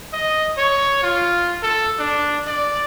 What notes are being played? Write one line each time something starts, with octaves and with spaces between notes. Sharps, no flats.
D#5
C#5
F4
A4
D4
D5